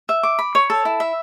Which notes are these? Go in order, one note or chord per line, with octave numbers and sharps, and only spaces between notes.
E5
D6
B5
C#5
A4
E4
E5